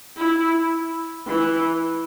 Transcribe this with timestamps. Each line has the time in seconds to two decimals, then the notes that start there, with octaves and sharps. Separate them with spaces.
0.17 E4
1.26 E3